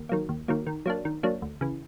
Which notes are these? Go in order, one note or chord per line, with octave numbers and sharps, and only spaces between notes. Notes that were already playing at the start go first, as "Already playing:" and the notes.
Already playing: D#2
D#3 F#3 A#3
D#2
D#3 F#3 A#3
D#3
F#3 A#3 D4
D#3
F#3 A#3 D4
D2
C#3 E3